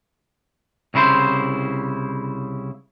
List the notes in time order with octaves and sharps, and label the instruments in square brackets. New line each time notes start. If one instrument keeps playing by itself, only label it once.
[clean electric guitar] C2 C#3 E4 B4 C5